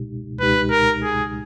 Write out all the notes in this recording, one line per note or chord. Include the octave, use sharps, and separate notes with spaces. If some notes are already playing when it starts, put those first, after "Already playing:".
Already playing: C#2 B2 G#3 D#4 G4
C#2 B2 G#3 D#4 G4 B4
A#4
G#4